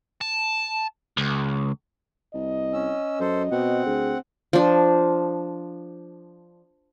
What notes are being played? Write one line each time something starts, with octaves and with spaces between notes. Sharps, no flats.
A5
C#2
C2 D#5
C#4 E6
F#2 A4 C5
B2 C4 F#5
D2 G#4
F3 D4